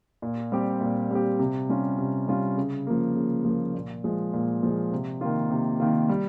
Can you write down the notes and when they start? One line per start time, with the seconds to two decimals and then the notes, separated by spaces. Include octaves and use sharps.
0.22 A#2
0.52 G3 C4 G4
0.81 A#2
1.11 G3 C4 G4
1.39 C3
1.69 G3 C#4 F4
1.98 C3
2.28 G3 C#4 F4
2.57 C#3
2.87 F3 A#3
3.16 C#3
3.45 F3 A#3
3.74 A#2
4.04 F3 G#3
4.33 A#2
4.63 F3 G#3
4.92 C3
5.21 D#3 A#3 F4
5.51 C3
5.80 D#3 A#3 F4
6.09 G3